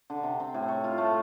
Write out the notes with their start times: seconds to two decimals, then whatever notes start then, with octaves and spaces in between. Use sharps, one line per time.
0.10 D3
0.23 C3
0.40 C4
0.54 A2
0.68 C#5
0.84 F4
0.98 A3